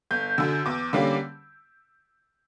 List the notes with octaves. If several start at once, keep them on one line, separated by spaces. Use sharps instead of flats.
G1 G6
F#2 D3 E6
E2 D6
D3 G3 A#3 C#4